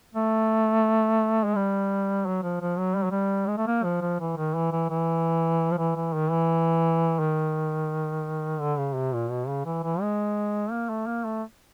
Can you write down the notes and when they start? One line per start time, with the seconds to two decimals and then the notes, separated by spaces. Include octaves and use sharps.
0.15 A3
1.44 G#3
1.55 G3
2.26 F#3
2.43 F3
2.61 F3
2.78 F#3
2.96 G3
3.04 F#3
3.11 G3
3.47 G#3
3.58 A3
3.67 A#3
3.84 F3
4.01 F3
4.20 E3
4.37 D#3
4.55 E3
4.72 E3
4.90 E3
5.71 F3
5.78 E3
5.96 E3
6.14 D#3
6.31 E3
7.19 D#3
8.60 D3
8.78 C#3
8.95 C3
9.13 A#2
9.30 B2
9.48 C#3
9.66 E3
9.83 E3
10.01 G#3
10.71 A#3
10.89 A3
11.07 A#3
11.24 A3